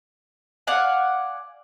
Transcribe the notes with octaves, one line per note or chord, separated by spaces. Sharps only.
D5 F5 F#5 G#5